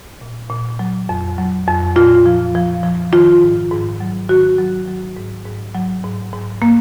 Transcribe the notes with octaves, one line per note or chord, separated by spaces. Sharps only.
A#2
A#2
F#3
F2
F#3
F2
A#2 F4
F3
F3
F3
D#3 F4
G#2
G#2
F#3
D#3 F#4
F#3
F#3
G#2
G#2
F#3
G#2
G#2
A#3